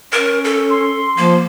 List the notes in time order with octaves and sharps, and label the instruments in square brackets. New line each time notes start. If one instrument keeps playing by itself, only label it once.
[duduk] C#4 [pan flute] A#4
[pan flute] A4
[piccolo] C6
[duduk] F3 [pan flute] A#3